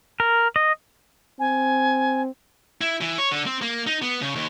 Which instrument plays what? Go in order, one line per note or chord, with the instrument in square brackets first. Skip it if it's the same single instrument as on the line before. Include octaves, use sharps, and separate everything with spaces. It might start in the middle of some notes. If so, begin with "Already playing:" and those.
[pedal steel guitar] A#4
D#5
[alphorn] C4 [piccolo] G#5
[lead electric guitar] E4
E3
C#5
D3
C4
A#3
D#4
B3
C#3
D#2